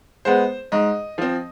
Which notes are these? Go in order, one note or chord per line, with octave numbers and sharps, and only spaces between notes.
G#3 B3 C5
G#2 D#5
F3 C4